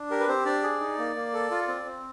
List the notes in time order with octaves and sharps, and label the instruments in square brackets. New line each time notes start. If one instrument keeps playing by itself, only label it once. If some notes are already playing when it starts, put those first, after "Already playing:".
Already playing: [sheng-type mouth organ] D4
G4 A#4
B4
C4 G4 C5
D4 D5
G#4
D#4
A#3
A#3
A4
F4
C4
C4